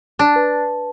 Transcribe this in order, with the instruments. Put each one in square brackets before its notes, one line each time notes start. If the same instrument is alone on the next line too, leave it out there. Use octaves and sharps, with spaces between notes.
[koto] D4 [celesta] A5
[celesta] B4